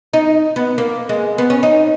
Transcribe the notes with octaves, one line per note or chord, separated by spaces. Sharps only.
D#4
B3
A#3
G#3
B3
C#4
D#4